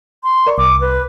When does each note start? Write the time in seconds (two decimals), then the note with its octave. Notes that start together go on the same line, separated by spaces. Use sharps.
0.24 C6
0.47 A#4 D5 C#6
0.58 C2 D6
0.81 B4